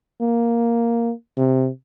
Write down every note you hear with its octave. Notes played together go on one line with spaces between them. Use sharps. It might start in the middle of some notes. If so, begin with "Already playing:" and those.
A#3
C3